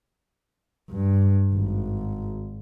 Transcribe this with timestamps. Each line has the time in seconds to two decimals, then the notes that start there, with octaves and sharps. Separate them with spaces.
0.90 G2
1.54 G#1